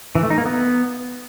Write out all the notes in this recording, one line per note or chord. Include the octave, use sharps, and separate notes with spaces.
E3
A3
D#4
A#3
B3